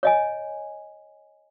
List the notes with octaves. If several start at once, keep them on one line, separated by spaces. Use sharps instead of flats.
C#5 D#5 G#5